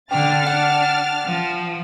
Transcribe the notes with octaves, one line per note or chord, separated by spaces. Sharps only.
D3 D4 G5 F6 A6
D4 F#5
F3